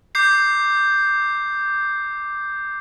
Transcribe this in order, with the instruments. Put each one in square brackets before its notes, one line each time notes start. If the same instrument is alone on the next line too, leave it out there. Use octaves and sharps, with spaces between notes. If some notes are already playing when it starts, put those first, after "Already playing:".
[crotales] D6 G6 C7